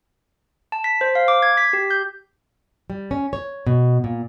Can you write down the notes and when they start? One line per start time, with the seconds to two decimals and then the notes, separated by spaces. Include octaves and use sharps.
0.72 A5
0.84 B6
1.01 C5
1.15 F5
1.28 D6
1.42 G#6
1.57 B6
1.73 G4
1.90 G6
2.90 G3
3.11 C#4
3.33 C#5
3.67 B2
4.04 A#2